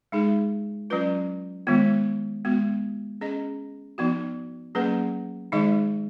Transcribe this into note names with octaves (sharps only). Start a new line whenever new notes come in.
G#3 D#4 G#4
F#3 C#4 F4 B4
D#3 G#3 B3 F4
G#3 B3 F#4
C#4 G#4 D#5
F3 B3 D#4 F#4
F#3 A#3 C#4 G#4 B4
D#3 G#3 D#4 G#4 D#5